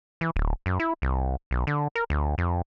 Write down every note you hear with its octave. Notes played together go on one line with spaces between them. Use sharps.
E3
D1
F#2
E4
C2
B1
D3
A#4
D2
F2